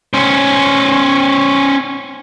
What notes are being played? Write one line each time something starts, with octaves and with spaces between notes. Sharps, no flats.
C#4 C5